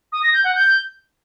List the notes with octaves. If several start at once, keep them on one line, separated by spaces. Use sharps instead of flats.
D#6
A#6
G6
F#5
G6